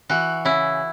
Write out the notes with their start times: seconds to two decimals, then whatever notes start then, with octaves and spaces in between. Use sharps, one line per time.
0.10 E3 F#4
0.45 C#3 E4